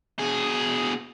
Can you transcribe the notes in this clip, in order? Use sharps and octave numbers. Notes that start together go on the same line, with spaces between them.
B2 G#4